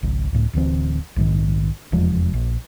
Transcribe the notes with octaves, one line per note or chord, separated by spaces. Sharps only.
G#1 C#2
C#2 A2
D1 D2 E3 C4
A#1 G#2 D#3
F1 E2 F3 G#3
A#1